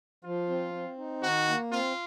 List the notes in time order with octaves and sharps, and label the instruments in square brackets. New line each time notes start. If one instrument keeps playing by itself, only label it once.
[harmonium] F3 [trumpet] F4
[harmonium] C4
C4
D#4
[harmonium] D#3 [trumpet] F#4
[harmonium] A#3
[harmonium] C4 [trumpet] F4